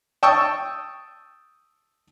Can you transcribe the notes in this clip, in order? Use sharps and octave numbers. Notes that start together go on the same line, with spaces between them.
G5 A5 C#6 D#6 E6